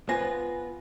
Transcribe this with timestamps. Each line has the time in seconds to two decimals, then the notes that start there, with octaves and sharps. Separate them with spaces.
0.09 B3 F4 B4 C5 G#5 A#6